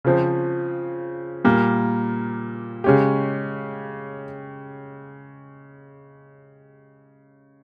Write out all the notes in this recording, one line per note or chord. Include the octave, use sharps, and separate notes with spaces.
C#3 F3 C4
A#2 G3 A#3
C#3 G#3 C#4 G4